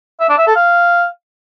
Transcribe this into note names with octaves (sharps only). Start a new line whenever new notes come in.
E5
D4
E5
A4
F5